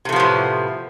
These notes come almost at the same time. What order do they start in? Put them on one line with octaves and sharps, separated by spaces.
C3 A3 F3 B3 A2